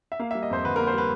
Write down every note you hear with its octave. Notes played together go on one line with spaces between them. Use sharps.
E5
A#3 F5
E5
G3
D#5
F2 C5
D3 B4
A#4
A#3
C5
G3 B4